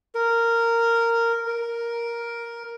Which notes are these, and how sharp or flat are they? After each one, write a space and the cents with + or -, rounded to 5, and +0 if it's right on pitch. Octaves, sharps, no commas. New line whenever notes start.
A#4 -10
A#4 +5